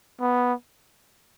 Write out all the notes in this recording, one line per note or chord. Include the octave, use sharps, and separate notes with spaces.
B3